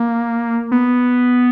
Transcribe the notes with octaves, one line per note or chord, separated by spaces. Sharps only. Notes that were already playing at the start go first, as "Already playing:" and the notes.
Already playing: A#3
B3